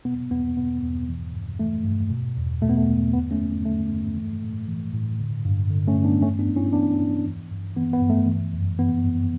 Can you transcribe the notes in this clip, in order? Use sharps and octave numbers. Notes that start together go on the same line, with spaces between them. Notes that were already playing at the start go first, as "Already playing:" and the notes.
B2 B3
E2 B3
B2 B3
E2
E3
G2
E3 A3
G2
B2
E2
B2 A3
B3
A3
E2
D3 B3
A3 C#4
G2
D3 A3
G2
E3
A2
E3
A2
D3
G2
D3
A3 C#4
G2
B3 D4
E3 A3 C#4
B3 D4
G2
C#4 E4
E3 B3 D4
G2
E3
G2
E3 B3
B3
G2
A3
E3
F#2
E3 B3
F#2